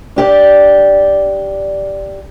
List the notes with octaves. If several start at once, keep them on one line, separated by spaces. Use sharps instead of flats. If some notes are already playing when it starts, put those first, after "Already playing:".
D4 G4 D5